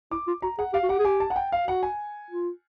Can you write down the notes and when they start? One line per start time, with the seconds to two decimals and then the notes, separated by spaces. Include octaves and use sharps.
0.11 E4 D6
0.27 F4
0.42 F#4 A#5
0.58 G#4 F#5
0.73 G4 F5
0.83 F#4
0.89 G4 F#5
0.99 G#4
1.05 G4 G#5
1.20 A5
1.30 F#5
1.36 G5
1.52 F5
1.67 F#4 F#5
1.83 G#5
2.31 F4